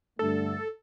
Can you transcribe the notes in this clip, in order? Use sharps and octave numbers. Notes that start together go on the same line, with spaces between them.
G2 D3 A3 A4